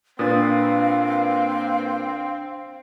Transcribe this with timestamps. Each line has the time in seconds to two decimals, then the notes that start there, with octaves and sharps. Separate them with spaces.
0.19 A#2 C4 D4 B4 F5 D#6 A6